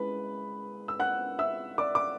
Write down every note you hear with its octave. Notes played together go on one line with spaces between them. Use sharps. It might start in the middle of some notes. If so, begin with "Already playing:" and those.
Already playing: G#3 C#4 E4 B4 B5
E6
F#5 F#6
E5 E6
D5 D6
D6